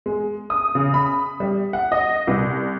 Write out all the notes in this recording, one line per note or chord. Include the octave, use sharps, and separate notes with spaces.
G#3
D#6
C#3
B5
G3
F#5
D#5
C2